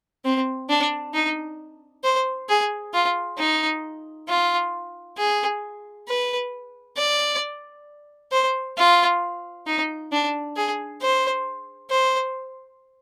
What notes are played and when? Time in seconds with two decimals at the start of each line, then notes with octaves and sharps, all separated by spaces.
0.25 C4
0.69 D4
1.14 D#4
2.04 C5
2.49 G#4
2.93 F4
3.38 D#4
4.28 F4
5.18 G#4
6.08 B4
6.97 D5
8.32 C5
8.78 F4
9.66 D#4
10.12 D4
10.56 G#4
11.01 C5
11.91 C5